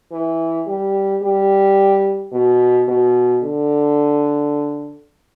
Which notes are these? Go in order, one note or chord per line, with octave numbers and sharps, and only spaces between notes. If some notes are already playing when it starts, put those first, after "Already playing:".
E3
G3
G3
B2
B2
D3